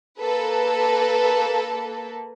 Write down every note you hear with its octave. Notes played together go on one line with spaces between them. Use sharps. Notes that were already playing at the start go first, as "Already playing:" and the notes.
A#3 A4 B4